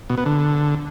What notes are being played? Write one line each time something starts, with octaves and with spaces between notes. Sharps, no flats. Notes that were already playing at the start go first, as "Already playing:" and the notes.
B2
B3
D3